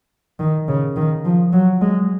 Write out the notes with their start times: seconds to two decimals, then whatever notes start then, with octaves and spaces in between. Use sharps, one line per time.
0.39 D#3
0.68 C#3
0.96 D#3
1.25 F3
1.53 F#3
1.81 G#3